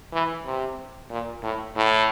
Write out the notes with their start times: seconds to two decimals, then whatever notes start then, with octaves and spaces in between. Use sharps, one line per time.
0.13 E3
0.45 C3
1.11 A#2
1.43 A2
1.77 A2